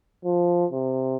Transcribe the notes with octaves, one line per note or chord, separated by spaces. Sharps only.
F3
C3